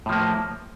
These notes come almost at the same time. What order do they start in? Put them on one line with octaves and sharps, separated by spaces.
A2 F3 A#3